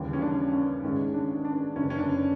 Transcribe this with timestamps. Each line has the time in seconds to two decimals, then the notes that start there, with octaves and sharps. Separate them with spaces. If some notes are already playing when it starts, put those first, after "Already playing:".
Already playing: D#2 C#3 E3 G3
0.13 C#4
0.22 D4
0.52 C#4
0.83 A1 G#2 D#3 G#3 C#4
1.14 D4
1.45 D4
1.76 F#1 F#2 D3 C#4
1.90 C#4
1.99 D4